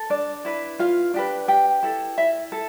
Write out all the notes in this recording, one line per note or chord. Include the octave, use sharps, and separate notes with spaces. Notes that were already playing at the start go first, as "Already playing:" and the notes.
Already playing: A4
D4 D5
E4 B4
F4 F5
D4 G4 B4
G4 G5
E4 A4
E4 E5
A4